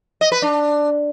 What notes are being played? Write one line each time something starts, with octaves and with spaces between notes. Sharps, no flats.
D#5
B4
D4